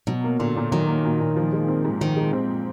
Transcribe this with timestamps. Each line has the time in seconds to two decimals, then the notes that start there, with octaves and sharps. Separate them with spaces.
0.07 B2 F#3
0.24 A#3
0.39 A#2 D3
0.56 A#2
0.72 D#3 F#3
0.87 A#3
1.05 A#2
1.20 A#2
1.36 F3
1.53 G#3
1.68 C4
1.85 G#2
2.01 D#3 F3
2.17 G#3
2.33 C4